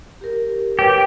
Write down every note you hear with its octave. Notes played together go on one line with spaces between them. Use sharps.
G4 A#4
G4 B4 C#5